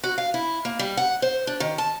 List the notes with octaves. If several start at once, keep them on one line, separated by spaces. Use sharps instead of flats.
F#4
F5
E4
A#3
G3
F#5
C5
D4
D#3
A5